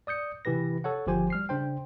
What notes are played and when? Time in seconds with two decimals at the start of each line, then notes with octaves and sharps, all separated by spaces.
0.07 D5 D#6 G6 C#7
0.45 C3 E3 G4 B4 A#6
0.84 A4 C#5 F#5
1.07 G1 F3 G4 C5 G#5
1.30 G3 F6 C7
1.49 C#3 D4 C5 G5